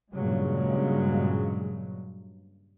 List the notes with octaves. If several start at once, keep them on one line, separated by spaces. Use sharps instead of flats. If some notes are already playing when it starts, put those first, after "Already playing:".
G2 A#2 C#3 F#3 G#3